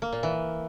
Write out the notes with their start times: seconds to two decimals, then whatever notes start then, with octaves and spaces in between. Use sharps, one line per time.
0.02 A#3
0.12 A#2
0.23 E3